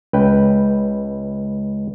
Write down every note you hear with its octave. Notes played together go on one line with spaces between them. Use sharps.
C#2 B4 G5